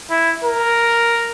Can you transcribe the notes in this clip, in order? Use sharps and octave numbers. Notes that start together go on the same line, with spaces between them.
E4
A#4